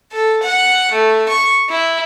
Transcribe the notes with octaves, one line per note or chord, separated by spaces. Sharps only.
A4
F#5
A3
C#6
E4